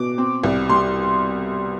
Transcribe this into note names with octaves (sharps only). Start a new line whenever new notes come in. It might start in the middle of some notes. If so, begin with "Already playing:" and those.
Already playing: B2 D6
C4
C2
G3 C6